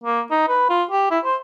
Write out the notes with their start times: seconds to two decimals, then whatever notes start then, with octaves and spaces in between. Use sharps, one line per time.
0.04 A#3
0.31 D#4
0.48 B4
0.69 F4
0.91 G4
1.11 E4
1.25 C5